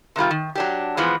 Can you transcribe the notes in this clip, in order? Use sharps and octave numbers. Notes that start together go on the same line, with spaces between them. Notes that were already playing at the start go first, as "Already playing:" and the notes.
C3 D#3 G3 F4
D#3
F#3 D4 G4
E3 F3 G#3 B3